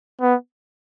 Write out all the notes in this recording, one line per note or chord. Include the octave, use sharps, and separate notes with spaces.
B3